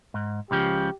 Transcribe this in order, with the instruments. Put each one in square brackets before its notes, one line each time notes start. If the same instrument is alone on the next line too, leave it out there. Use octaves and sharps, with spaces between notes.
[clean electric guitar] G#2
[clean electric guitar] C#2 C#3 F3 [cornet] G4